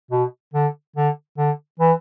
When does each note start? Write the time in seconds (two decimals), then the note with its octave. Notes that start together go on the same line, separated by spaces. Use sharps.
0.11 B2
0.54 D3
0.96 D3
1.38 D3
1.79 E3